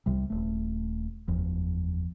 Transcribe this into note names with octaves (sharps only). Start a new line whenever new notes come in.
C2 C3 G3
D#1 A3
F#1 E2 F3